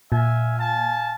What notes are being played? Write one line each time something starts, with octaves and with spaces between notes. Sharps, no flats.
A#2 E5 F5 G#5
F5 G#5 A5